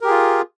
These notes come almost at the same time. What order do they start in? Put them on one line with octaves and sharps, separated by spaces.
A#4 G4 G#4 F4